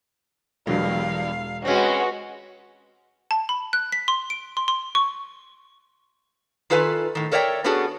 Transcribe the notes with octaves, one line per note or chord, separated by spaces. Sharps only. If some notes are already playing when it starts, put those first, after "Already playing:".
E1 E2 G2 F#3 F5
G#3 C4 C#4 F#4 B4
A5
B5
F#6
B6
C6
D7
C6
C6
C#6
D#3 F4 A4 B4 E5 G#5
A2 D#3
A4 A#4 C#5 D5 E5 G5
B3 C#4 D4 F#4 G#4 A4